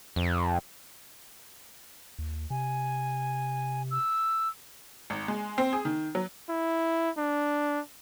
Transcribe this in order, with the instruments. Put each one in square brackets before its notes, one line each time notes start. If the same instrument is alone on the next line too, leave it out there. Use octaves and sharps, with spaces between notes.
[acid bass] F2
[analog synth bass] D#2
[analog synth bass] C3 [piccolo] G#5
[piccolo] E6
[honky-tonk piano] G#1
G#3
C4
G#4
D#3
F#3
[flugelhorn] E4
D4